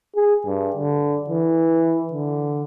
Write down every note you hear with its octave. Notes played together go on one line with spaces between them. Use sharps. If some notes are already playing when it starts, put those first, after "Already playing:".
G#4
G2
D3
E3
D3